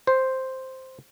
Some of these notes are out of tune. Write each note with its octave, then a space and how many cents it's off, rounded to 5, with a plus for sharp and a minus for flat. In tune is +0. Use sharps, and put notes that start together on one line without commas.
C5 +0